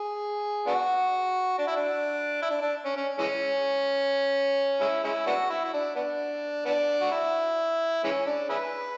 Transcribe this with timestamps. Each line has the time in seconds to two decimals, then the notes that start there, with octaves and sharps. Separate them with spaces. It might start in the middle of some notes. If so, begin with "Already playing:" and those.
Already playing: G#4
0.66 B3 D4 F#4
1.58 D4
1.68 E4
1.77 D4
2.43 E4
2.50 D4
2.62 D4
2.85 C#4
2.96 C#4
3.19 E3 G#3 C#4
4.80 G#3 C#4 E4
5.04 G#3 C#4 E4
5.26 B3 D4 F#4
5.50 E4
5.64 E4
5.73 D4
5.95 B3 D4
6.65 B3 D4
7.01 F#4
7.12 E4
8.04 E3 G#3 C#4
8.26 D4
8.49 E4 G#4 B4